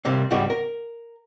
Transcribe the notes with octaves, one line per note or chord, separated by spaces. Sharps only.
C3 G3 A#3 C4
C#2 G#2 G3 B3 F#4 D5
A#4